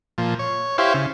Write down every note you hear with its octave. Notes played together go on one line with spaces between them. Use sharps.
A#2 F3
C#5
E4 G4 C5 C#5 F5
C#3